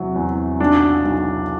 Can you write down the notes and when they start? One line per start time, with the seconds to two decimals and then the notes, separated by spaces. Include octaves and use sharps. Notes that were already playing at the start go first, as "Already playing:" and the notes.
Already playing: E2 C3 F#3
0.16 E2
0.60 B1 D4
1.05 B1